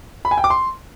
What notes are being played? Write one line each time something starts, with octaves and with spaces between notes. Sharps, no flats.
B5
G#5
G5
D6
C6